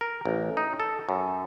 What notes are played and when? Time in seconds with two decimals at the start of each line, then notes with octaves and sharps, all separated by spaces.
0.01 A#4
0.25 A1
0.57 D#4
0.80 A4
1.09 F#2